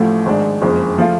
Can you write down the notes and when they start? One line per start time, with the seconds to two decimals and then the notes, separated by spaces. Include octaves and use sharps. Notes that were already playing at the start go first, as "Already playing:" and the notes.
Already playing: A1 A2 F3 A3 F4
0.26 G#1 G#2 G#3 D4
0.62 F#1 F2 C#3 G#3
0.98 F3 A3 F4